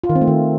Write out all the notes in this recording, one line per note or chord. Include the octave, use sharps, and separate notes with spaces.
F4
D#3
C4
A3
D#3